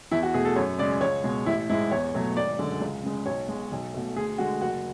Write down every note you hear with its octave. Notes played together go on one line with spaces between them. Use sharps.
E2 E4
F#4
B2 A3 G#4
A4
F#2 C#5
C#3 G#3 D5
C#2 C#5
B2 G#3
A1 E4
G#2 G#3 E4
E2 C#5
B2 F#3 A3
G#1 D5
F#2 D3 G#3
C#2
C#3 G#3
B1 C#5
B2 G#3
B1
B2 A3
D2 G#4
D3 G#3 F#4
F#1 F#4